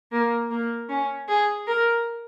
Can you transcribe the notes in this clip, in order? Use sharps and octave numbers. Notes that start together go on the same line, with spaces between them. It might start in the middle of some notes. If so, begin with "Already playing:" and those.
A#3
A#3
C#4
G#4
A#4